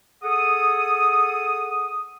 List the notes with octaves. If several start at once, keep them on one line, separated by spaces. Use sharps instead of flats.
G#4 A4 F#5 D#6